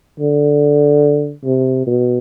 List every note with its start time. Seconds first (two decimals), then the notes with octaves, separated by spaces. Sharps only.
0.20 D3
1.45 C3
1.87 B2